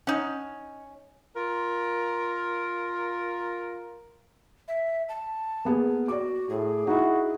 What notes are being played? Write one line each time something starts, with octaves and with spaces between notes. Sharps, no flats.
C#4 D#4 F#5
F4 A#4
E5
A5
A#3 B3 G#4
F#4 D5 D6
A2 G#4
D#4 E4 F#4